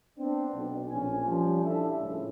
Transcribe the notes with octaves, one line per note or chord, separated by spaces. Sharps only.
B3 C4 D4
B1
A#1 A#2 C4 C#4 G#5
F3 G3 C#4
D4 E4 A4 D5 E5
C#2 A2